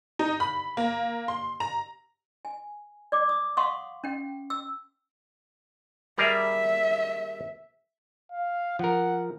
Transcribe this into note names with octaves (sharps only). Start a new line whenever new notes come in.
D#4
B5
A#3
C6
A#5
G#5
D5 D6
D#6
F5 F#5 C6 C#6 D#6
C#4 G5
E6
G3 G#4 A#4 E5
F5
F3 A#4 F#5